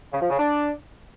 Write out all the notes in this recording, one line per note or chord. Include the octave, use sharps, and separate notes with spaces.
C#3
F3
C#3
D4